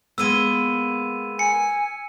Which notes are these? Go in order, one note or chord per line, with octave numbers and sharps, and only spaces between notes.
G#3 A#3 B3 E6 D#7
G#5 C#7